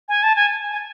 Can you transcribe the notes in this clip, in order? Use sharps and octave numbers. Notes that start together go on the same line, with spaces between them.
G#5
A5
G#5
G#5